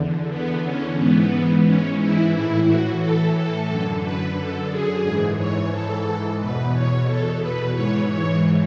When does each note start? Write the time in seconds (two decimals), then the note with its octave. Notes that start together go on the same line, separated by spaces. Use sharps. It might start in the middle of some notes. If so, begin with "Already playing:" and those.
Already playing: E2 D3
0.30 B3
0.64 C#4
0.98 G#2 E3 B3
1.65 C#4
2.00 E4
2.33 A2 E3 E4
2.66 F#4
3.01 A4
3.35 A4
3.68 F#2 D3
4.03 B4
4.37 A4
4.70 G#4
5.04 G#2 E3
5.38 C#5
5.72 A4
6.39 E2 B2 B4
6.74 C#5
7.07 A4
7.40 B4
7.74 G#2 E3 C#5
8.08 C#5